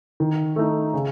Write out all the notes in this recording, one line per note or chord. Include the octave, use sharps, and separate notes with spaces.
D#3
A3 D#4
C#3